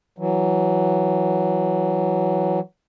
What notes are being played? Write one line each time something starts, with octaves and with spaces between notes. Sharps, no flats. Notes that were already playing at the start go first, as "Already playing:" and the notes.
E3 F#3